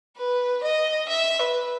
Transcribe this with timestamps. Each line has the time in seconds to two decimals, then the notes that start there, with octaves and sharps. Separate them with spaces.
0.18 B4
0.63 D#5
1.09 E5
1.39 B4